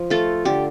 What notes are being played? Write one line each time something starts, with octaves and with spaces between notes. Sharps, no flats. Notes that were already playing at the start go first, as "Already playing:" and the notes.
Already playing: F3
A3 F4 A4
D3 G4